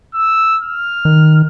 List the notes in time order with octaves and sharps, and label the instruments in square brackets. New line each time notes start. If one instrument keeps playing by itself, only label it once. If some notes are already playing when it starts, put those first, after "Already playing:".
[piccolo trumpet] E6
F6
[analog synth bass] D#3